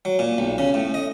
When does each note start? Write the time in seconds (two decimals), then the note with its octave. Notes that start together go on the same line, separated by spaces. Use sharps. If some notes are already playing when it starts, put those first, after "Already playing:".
0.05 F#3
0.19 A#2
0.38 B1
0.58 C#3
0.74 A2
0.94 D#5